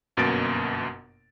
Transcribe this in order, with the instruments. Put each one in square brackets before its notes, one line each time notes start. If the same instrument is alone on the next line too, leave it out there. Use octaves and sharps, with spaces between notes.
[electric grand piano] G1 F#2 B2 A#3 A6 D7